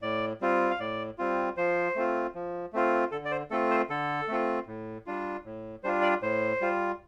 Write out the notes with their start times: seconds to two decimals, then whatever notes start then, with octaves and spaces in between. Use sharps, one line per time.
0.02 A2 D5
0.41 G3 C4 F4
0.71 F5
0.79 A2 D5
1.18 G3 C4 F4
1.57 F3 C5
1.95 A3 C4 F4
2.35 F3
2.73 A3 C4 F4
3.12 D3 A4
3.25 D5
3.31 C5
3.51 A3 C4 F4 A4
3.70 C5
3.90 D3 A4
4.28 A3 C4 F4
4.67 A2
5.06 G3 D4 F4
5.45 A2
5.83 G3 D4 F4 C5
6.02 D5
6.22 A2 C5
6.61 G3 F4